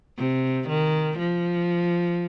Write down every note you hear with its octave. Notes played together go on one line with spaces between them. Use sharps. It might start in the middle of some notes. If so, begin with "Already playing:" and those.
C3
D#3
F3